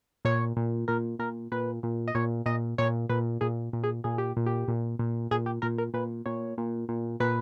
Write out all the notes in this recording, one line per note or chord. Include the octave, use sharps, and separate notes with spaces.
A#2 C#5
A#2
A#2 A#4
A#2 A#4
A#2 B4
A#2
D#5
A#2 C#5
A#2 D#5
A#2 C#5
A#2 B4
A#2 G#4
A#2
G#4
A#2 G#4
G4
A#2
G4
A#2
A#2
A#2 G#4
G4
A#2 A#4
A#4
A#2 B4
A#2 C#5
A#2
A#2
A#2 B4